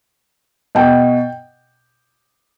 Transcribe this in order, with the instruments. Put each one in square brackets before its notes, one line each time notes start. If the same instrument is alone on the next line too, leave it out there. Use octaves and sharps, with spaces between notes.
[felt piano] B2 G5